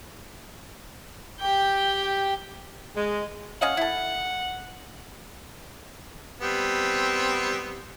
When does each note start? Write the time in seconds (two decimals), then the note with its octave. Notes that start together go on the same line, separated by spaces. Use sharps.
1.40 G4 G5
2.96 G#3
3.62 C#4 D#5 F5 F#5
3.77 E4 A4
6.41 G3 B3 C4